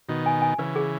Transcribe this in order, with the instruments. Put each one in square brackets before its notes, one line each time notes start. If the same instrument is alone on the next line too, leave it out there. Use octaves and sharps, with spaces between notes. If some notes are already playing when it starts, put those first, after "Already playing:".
[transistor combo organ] B2 D#3 [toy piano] F#4
[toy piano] G#5
G#5
[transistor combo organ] C#3 E3 [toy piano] B4
[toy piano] G#4